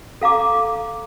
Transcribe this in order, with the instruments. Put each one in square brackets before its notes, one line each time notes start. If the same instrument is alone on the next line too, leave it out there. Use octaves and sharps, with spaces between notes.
[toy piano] A4 F5 A#5 D6